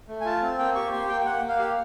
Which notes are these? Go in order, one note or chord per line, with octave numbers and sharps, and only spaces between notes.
A3
G#5
F4 A5
C4
A#3 G5
G4 C#6
A#3 C6
A#3 G5
G5
A#3 F#5
A#3
F5
G4